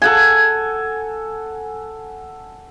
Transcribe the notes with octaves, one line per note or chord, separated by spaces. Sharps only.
A4 F#5 G#5